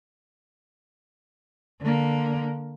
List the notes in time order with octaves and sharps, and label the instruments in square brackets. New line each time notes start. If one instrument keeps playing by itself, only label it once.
[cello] D3 A#3